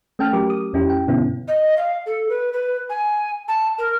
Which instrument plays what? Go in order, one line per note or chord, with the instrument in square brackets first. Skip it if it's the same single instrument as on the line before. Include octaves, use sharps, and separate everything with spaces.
[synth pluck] A3 C#4 G5 A5 F6
F#3 G4 A#4 D6
D#6
F2 C#4 E4 G4
G5
G2 B2 D3 B3 C#4 E4
[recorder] D#5
F5
A4
B4
B4
G#5
A5
A#4